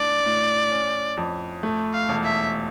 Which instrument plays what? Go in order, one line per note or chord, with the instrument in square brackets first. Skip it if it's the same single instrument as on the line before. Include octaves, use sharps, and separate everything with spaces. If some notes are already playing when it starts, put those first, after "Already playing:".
Already playing: [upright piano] A2 D4 [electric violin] D5
[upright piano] A2
C#4
F2
A3
[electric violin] F5
[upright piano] E1
[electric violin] E5